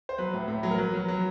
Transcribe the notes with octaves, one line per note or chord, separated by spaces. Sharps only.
C5
F#3 B4
A2
A2
F#3
A#4
F#3 B4
F#3
F#3